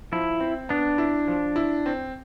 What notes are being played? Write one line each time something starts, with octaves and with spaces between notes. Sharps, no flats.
F3 E4
C4
B3 D4
E4
F3
E4
C4